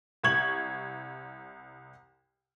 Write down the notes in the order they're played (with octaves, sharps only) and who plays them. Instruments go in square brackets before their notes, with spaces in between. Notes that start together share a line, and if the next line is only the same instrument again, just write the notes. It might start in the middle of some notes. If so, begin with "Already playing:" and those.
[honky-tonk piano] C2 C#6 G#6 F#7